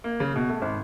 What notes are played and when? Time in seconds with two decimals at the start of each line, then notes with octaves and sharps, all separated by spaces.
0.04 A#3
0.20 C#3
0.36 B2
0.49 A3
0.62 G#1